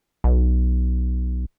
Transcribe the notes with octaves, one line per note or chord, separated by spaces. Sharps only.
B1